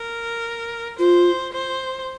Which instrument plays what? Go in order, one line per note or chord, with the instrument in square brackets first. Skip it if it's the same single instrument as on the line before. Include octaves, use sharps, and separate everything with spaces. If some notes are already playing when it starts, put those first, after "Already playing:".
Already playing: [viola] A#4
[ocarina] F4 [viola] C5
[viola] C5